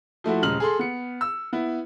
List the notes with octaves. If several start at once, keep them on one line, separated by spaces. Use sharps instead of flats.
F3 A3 E4 F#4
D#1 C#3 G#3 F6 F#7
G#4 A4 C6
B3 C#7
E6
B3 E4